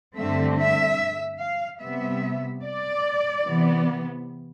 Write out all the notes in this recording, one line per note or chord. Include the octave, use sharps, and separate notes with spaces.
G2 D3 A3 C4 E5
E5
F5
C3 G3 B3 E5
D5
C3 E3 B3